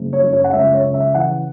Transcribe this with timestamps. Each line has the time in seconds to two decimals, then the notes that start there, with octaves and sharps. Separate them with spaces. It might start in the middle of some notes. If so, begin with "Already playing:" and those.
Already playing: F#1
0.13 C#5
0.23 F#2
0.33 C#5
0.44 F#5
0.53 C#2 E5
0.74 C#5
0.84 C#3
0.94 E5
1.14 E3 F#5